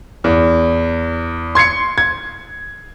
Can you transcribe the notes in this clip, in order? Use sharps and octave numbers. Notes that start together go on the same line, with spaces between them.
E2
C6 G#6 C7 C#7
G#6